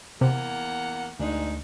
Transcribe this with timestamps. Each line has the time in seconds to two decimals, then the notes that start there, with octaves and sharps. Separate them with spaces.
0.21 E2 C3 A#3 F#5
1.20 D2 G#2 D4 D#4